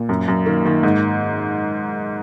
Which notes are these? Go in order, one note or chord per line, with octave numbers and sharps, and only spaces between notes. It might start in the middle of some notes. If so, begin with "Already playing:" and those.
Already playing: A#2
F#2
F#2
D#3 A#3
D#3
G#2